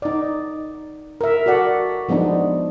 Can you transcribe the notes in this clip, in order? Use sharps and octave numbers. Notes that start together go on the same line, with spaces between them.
D#4 D5
A#4 E5
F#4 A4 D5 F#5
F3 G#3 B3 D4 D#4